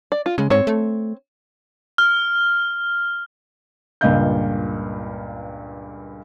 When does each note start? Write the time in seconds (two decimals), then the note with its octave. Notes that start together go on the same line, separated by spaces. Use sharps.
0.12 D5
0.26 F4
0.38 C#3 G#3
0.50 G#2 C4 C#5
0.67 A3
1.98 F6
4.01 C#2 G2 A#2 D#5 F5 G6